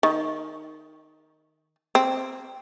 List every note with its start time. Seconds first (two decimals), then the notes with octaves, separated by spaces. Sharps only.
0.03 D#3
1.95 C4